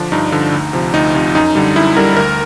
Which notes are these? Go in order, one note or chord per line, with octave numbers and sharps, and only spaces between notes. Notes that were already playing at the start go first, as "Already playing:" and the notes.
Already playing: D3 F3 D4
G2 D#4
D3 F3
D2
C3 F3
D2 D#4
C3 F3
F#2 D#4
D3 G3
F#2 E4
D3 G3 A#4
D2 A#4